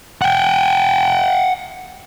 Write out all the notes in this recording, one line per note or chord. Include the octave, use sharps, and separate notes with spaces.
F#5 G5